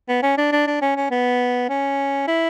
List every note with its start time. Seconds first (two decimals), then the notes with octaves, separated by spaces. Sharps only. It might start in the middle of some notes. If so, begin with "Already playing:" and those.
0.08 B3
0.23 C#4
0.38 D4
0.52 D4
0.67 D4
0.81 C#4
0.96 C#4
1.11 B3
1.69 C#4
2.28 E4